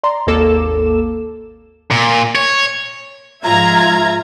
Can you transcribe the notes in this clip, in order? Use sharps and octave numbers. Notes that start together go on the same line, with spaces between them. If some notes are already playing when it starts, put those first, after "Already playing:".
D5 A#5 C6
G#1 D#2 A#3 A4 D6 E7
A#2
C#5
G#2 F3 F4 E5 A#5 G#6